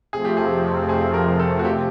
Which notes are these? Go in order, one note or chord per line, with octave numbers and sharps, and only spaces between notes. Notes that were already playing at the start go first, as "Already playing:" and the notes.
F2 C3 F3 A3 C4 G#4
G4
G#4
G#4
A#4
A4
F#4
G4